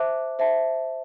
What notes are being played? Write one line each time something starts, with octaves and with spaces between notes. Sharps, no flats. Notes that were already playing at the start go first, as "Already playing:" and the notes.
Already playing: C5 E5 A5 D6 F#6
C5 E5 A5